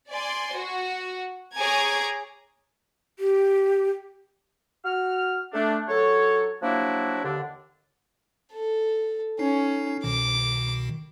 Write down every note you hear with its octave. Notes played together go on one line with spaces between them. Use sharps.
D5 G#5 C6
F#4
G#4 C#5 G#5 A#5 D6 G#6
G4
F#4 F6
A3 D4
F#3 A4 C#5
F3 F#3 A#3 D4 E4 F#4
D#2 D3 D4
A4
C#4 D#4 C7
C2 B2 D#3 D6